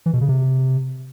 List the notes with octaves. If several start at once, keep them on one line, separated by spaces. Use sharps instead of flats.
E3
B2
C#3
C3